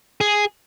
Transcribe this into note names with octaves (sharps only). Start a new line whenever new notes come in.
G#4